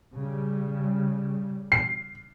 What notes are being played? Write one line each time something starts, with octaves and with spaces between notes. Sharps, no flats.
C#3 G3
C7